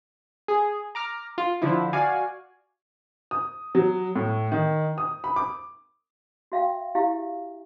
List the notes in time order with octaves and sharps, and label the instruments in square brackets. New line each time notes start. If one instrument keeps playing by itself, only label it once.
[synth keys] G#4
A#5 D6 F6
F4
D3 F3 E4
F#4 D5 F5 G#5
[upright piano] D#6
F#3
A2
D#3
D#6
B5
D6
[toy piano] F#4 E5 F5 G5
E4 G4 E5 F5